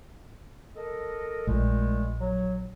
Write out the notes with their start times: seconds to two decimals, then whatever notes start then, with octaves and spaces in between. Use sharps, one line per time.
0.75 A4 A#4 D#5
1.47 A#1 A#2 G#3 A3
2.19 F#3